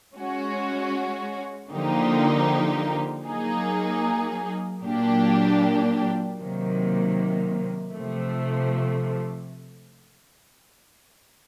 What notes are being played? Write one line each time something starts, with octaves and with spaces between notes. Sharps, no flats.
G#3 C#4 F#4
D3 F3 A#3 D#4 G4
F#3 A#3 D#4 G#4
A#2 F#3 A#3 D4 G4
C3 D#3 F#3 A#3
C3 F3 A3